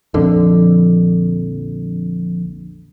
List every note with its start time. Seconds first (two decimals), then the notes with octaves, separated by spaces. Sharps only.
0.14 A#1 F2 D3